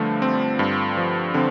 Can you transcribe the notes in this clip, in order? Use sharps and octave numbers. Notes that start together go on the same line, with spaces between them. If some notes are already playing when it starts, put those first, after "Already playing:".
Already playing: G2 D3 F3 A3
C4
G2
F3
D3 C4